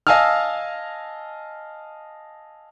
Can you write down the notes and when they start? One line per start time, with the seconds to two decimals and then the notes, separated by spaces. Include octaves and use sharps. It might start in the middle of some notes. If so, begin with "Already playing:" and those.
0.07 D#5 F5 G#5 A5 E6 F6